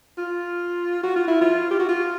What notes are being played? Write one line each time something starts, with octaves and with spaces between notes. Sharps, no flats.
F4
F#4
F4
E4
F4
G4
F#4
F4